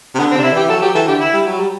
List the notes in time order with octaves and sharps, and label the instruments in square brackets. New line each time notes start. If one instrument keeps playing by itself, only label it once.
[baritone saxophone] C3
[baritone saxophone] D3 [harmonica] B3
[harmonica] C4
[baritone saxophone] C3 [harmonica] D4
[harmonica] E4
[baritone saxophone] E3 [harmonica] G4
[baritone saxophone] F#3 [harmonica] A4
[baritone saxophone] F#3 [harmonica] G4
[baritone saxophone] E3 [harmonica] A4
[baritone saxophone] D3 [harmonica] G4
[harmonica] E4
[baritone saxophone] G3
F#3
G3